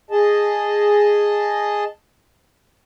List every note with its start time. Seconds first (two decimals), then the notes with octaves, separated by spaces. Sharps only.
0.11 G#4 D#5 A5